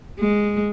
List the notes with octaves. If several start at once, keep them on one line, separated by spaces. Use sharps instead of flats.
G#3